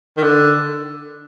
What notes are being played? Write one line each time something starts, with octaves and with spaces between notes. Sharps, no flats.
D#3
D3